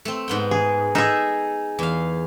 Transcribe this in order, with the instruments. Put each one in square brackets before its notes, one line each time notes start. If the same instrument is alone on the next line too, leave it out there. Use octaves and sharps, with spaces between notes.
[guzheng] A3 C4
G#2 B3 G5
[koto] G#4
[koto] D#4 G#4 [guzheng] A4 D#5 E5
[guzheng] E2 F5